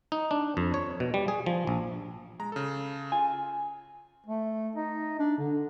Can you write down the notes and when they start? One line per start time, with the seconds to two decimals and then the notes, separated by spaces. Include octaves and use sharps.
0.12 D#4
0.31 D4
0.57 F2
0.74 C#5
1.00 B2
1.14 G3
1.28 G#4
1.46 F3
1.67 A#1
2.39 G#3 A#5
2.52 C#3 A4
3.12 F4 G#5
4.26 A3
4.75 D#4
5.19 D4
5.38 D3